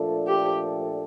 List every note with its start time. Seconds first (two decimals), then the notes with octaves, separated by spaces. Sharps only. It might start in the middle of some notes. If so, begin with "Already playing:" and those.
Already playing: A#2 F3 A3 D4 A4
0.28 G4